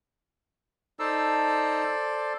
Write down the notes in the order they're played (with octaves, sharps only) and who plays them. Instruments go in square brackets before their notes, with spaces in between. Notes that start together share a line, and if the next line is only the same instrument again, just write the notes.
[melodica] D#4 A5 E6 [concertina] A4 C5 D5